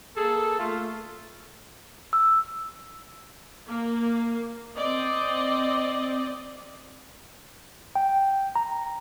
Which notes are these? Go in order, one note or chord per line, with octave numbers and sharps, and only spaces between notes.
A#3 G#4 A4
A3 F4
E6
A#3
C4 D5 D#5
G5
A#5